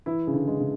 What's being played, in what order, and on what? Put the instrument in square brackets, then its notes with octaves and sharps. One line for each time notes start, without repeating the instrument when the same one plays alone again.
[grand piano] E3 [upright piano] E4
[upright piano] C#3
[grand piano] D3
[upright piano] G#3
[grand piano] C#3